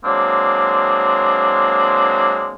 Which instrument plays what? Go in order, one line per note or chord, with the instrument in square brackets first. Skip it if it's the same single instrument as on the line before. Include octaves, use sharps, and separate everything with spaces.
[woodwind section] F#3 G#3 A#3 C4 D4